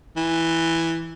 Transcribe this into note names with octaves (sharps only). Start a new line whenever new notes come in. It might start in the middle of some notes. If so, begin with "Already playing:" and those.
E3